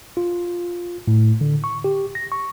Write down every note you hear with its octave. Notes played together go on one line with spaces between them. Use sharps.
F4
A2
D3
C#6
G4
A#6
C#6